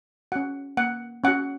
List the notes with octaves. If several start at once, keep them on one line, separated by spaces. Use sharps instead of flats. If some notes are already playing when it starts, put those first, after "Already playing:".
C#4 F#4 F#5
A#3 F#5
C#4 F#4 F#5